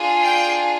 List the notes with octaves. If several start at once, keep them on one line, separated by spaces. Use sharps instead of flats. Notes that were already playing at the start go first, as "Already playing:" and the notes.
Already playing: D4 F4 G#4
G5